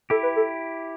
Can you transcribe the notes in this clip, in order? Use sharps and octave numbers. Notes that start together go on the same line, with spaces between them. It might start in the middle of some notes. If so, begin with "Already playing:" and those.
E4 G4 A4
B4
A4